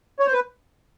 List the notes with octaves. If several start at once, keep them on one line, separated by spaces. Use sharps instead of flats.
C#5
C5
B4